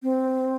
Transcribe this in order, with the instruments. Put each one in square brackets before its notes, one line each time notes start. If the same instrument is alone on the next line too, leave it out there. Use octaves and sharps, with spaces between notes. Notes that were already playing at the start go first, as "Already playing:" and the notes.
[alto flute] C4